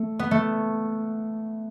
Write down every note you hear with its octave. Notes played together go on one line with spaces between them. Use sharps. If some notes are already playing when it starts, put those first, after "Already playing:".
Already playing: A3
B3
A3